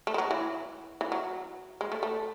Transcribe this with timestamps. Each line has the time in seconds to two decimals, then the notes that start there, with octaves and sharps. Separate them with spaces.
0.07 A3
0.14 G#3
0.18 F#3
0.31 E3
1.01 E3
1.12 F#3
1.81 G#3
1.92 A3
2.03 A3